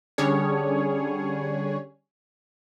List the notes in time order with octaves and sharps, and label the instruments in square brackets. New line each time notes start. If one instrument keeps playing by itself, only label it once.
[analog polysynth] D3 G3 C#4 D4 G#4 C#5